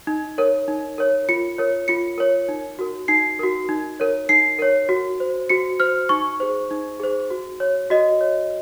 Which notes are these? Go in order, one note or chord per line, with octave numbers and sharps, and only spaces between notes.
D#4
A#4 C#5
D#4
A#4 C#5
F4 C#7
A#4 C#5
F4 C#7
A#4 C#5
D#4
F#4 A#4
D#4 C7
F#4 A#4
D#4
A#4 C#5
D#4 C7
A#4 C#5
F#4
C5
F#4 C#7
C5 F6
D#4 C#6
G#4 C5
D#4
G#4 C5
F#4
C#5
F#4 D#5
C#5